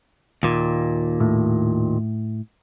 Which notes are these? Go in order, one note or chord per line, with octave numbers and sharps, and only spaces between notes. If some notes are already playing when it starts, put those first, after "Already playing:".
D#2 A#2
A2